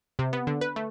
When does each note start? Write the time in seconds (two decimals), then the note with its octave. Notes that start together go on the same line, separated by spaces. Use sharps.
0.19 C3
0.33 B3
0.47 D3
0.61 B4
0.76 A3